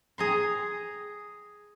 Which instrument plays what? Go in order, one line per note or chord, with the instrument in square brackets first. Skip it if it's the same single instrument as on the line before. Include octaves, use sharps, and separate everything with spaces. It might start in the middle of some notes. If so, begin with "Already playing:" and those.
[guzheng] G#4 A#5 C6